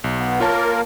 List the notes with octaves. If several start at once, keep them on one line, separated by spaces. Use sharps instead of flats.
B1
B3
A#3 F4 A#4 C#5 A5